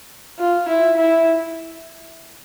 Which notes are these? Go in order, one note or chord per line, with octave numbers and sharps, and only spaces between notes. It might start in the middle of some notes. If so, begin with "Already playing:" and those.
F4
E4
E4